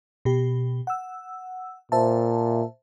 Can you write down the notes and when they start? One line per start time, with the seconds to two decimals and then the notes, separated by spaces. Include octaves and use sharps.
0.25 B2 G4
0.87 F#5 E6
1.92 A#2 C5 E5 A5